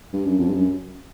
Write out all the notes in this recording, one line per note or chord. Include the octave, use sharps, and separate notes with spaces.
G2
F#2
F2
G2
F#2